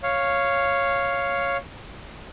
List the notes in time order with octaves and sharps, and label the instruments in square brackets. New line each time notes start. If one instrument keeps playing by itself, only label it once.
[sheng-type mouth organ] C#5 F5